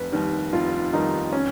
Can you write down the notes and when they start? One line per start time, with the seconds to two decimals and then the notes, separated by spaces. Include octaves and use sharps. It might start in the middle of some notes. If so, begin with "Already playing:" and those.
Already playing: F1 B4
0.12 D#2 D#3 G3
0.53 F1 F4
0.93 D#2 D#3 G3 D#4
1.33 C#4